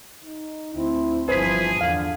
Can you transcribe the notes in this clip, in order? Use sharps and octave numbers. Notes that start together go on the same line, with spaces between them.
D#4
D2 C4 E4
G1 E3 F3 G#4 B4 C5 B6
E2 D3 F5